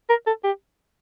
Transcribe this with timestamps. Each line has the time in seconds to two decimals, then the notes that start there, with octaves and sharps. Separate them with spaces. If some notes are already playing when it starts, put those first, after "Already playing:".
0.09 A#4
0.27 A4
0.44 G4